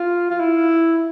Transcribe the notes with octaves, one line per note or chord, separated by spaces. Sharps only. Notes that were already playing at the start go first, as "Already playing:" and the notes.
Already playing: F4
F4
E4